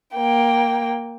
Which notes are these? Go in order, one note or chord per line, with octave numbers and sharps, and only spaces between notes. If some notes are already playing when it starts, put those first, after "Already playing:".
A#3 G5